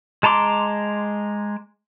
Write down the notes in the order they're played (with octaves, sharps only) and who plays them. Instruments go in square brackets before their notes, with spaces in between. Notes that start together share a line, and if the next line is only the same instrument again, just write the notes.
[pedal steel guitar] G#3 A5 A#5 C6 D6